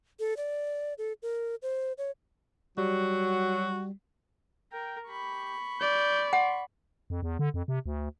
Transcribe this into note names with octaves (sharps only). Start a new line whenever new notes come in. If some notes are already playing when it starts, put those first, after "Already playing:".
A4
D5
A4
A#4
C5
C#5
F#3 G3 F#4
A#4 G5
G4 B5 C#6
D5 G6
F#5 C6
F2
E2
D3
F2
C3
D2